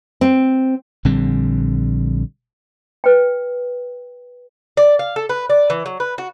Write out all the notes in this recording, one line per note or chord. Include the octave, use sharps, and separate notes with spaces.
C4
A#1 D3 G3 C4
B4 G5
D5
F5
A4
B4
D5
E3
F#3
B4
F#4